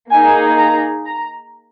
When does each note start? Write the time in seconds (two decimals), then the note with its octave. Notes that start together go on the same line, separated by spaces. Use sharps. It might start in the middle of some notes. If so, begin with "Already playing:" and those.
0.11 A#3 D#4 G#4 G#5
0.58 A#5
1.06 A#5